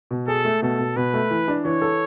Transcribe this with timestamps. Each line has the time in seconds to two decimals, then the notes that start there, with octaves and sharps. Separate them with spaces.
0.11 B2
0.28 G#4 A4
0.45 A3
0.62 B2 A4
0.79 B2
0.96 B2 B4
1.14 A3
1.31 E3
1.48 D4
1.65 E3 C#5
1.82 A4